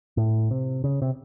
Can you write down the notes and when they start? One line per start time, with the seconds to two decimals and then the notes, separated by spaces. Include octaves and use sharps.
0.17 A2
0.51 C3
0.84 C#3
1.02 C3